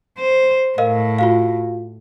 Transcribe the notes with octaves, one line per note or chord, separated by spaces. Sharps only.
C5
A2 A#4 D#5 F5
F4 F#4 F5